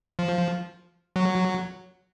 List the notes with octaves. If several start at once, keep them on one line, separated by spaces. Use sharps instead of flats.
F3
F#3